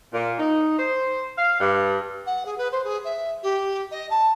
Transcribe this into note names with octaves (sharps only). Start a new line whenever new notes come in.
A#2
D#4
C5
F5
G2
F#5
G#4
B4
C5
G#4
E5
G4
D#5
A5